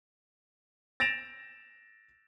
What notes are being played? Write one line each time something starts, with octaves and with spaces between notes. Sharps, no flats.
A6 A#6 D7 E7 F7